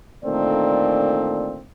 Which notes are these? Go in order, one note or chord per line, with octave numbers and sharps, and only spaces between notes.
A#2 D3 D#3 A3 C4 D5